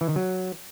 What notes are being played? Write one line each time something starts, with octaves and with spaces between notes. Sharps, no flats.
E3
D#3
F#3